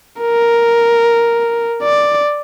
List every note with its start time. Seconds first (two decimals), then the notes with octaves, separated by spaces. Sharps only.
0.22 A#4
1.82 D5